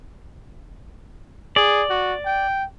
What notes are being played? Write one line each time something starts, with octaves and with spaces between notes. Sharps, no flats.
G#4 D5
F#4
G5